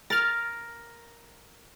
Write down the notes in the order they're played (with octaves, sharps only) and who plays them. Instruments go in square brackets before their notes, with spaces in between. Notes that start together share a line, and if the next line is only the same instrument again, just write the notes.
[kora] A#4 [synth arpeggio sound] F6 A6